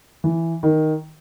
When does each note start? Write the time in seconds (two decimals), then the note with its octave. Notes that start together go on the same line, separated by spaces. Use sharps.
0.24 E3
0.63 D#3